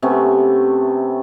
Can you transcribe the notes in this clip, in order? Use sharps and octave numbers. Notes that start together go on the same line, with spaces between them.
C3 A3 B3 C#4